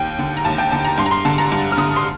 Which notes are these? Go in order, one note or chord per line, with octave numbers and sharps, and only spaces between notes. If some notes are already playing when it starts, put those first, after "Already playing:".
Already playing: D#2 G5
D3
A#5
D#2 A5
G5
D3 A5
A#5
G2 C6
A#5
C6
D3 A5
A#5
G2
F6
D3 D#6
C6